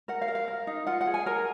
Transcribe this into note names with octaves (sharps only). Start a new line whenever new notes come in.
A#4 F#5
F5
A#4
F5
A#4
D#4
F4 F#5
F#5
G#4
G#5
A#4 A#5